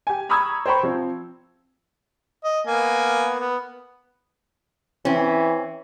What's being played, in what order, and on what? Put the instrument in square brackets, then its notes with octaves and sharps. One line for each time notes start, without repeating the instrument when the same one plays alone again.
[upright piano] G4 G#5
A#5 B5 C#6 D#6 E6 G#6
C5 G5 A#5 B5 C#6
F3 C4
[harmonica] D#5
A#3 B3 G#5
B3
[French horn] E3 [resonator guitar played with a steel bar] C4 C#4